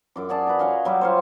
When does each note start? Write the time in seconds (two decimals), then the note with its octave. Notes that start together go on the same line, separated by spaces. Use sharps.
0.16 F#2 D6
0.29 F#4 G#4 D5 A5
0.47 B4 A#5
0.59 C#5 D#5 F5 G#5
0.85 F#3 G3 G4 D6
1.01 C5 C#5 F5